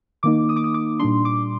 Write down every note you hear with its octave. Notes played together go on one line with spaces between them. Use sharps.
D#3 A#3 D#4 D6
D#6
D6
D#6
D6
A#2 G3 D4 C6
D6